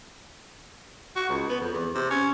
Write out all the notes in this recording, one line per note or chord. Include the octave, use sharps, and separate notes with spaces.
F#4
C#2
B3
F2
E2
C3
C#4